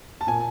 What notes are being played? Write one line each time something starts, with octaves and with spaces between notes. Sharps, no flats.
A5
A#2 G#5